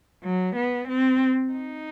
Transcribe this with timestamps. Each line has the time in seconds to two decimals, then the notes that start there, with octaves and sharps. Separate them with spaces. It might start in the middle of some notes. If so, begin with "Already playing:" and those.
0.25 F#3
0.57 B3
0.89 C4
1.53 D#4